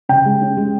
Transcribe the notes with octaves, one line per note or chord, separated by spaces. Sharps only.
C#3 G5
G#3
C#4
G#3